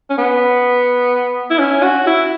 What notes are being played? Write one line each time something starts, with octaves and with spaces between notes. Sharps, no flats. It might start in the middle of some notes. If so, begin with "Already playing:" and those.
C#4
B3
E4
C#4
F#4
E4